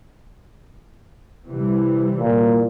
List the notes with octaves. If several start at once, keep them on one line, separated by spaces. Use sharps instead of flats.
C3 E3 G3
A#2